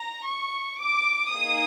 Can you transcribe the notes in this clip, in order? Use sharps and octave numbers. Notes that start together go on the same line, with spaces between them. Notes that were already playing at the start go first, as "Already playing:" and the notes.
Already playing: A#5
C#6
D6
A#3 D#4 G#4 D#6